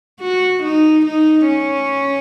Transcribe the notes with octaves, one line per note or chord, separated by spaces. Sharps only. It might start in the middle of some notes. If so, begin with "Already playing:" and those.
F#4
D#4
D#4
C#4